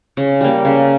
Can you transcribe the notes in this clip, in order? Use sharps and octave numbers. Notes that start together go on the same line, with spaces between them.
C#3
G3 A#3
C#3